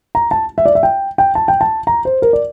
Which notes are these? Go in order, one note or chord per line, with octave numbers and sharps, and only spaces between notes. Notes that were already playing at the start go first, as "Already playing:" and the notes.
A#5
A5
E5
D5
E5
G5
G5
A5
G5
A5
A#5
C5
A#4
D5